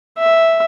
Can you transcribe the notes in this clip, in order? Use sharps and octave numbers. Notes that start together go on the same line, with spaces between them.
E5